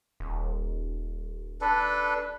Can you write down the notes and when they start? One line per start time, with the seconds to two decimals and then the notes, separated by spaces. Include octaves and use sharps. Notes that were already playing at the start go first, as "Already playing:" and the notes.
0.20 D#1
1.61 D4 A4 B4